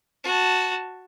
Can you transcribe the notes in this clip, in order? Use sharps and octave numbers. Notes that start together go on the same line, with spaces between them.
F#4 A5